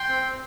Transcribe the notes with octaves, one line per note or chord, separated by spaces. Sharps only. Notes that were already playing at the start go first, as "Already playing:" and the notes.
Already playing: G5 C6
C4
C4